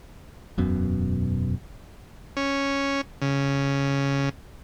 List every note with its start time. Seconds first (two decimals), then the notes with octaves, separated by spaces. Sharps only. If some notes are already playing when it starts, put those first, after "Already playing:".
0.58 E1 F#2 B2
2.37 C#4
3.22 C#3